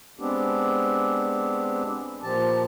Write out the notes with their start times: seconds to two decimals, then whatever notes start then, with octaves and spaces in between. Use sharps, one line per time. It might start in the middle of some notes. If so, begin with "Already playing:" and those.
0.19 G#3 B3 C4 D4 G4
2.23 A#2 F3 G4 A5